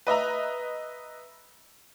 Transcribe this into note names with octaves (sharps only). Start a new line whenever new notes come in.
B4 D#5 E5 A#5